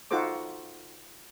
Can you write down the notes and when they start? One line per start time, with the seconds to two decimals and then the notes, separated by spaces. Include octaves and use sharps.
0.11 D#4 F4 F#4 A4 C5 D6